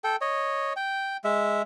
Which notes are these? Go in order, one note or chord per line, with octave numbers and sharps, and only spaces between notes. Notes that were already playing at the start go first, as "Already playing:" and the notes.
A4 G5
C#5 D#5
G5
G#3 E5